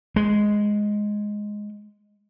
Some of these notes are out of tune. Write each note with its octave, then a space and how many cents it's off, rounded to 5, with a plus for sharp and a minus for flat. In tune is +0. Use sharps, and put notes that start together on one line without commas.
G#3 +0